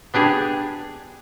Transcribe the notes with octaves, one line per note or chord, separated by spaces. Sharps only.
B3 D4 G4 G#4